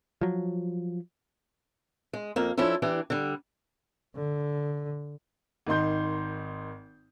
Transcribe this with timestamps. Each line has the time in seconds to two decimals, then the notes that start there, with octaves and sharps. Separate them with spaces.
0.21 F3 F#3
2.13 G#3
2.36 F2 A#3
2.57 F3 C#4 D4 E4 A4
2.82 E3 D4 G4
3.10 D3 G3
4.15 D3
5.67 G#1 D#3 D#4 C6 G6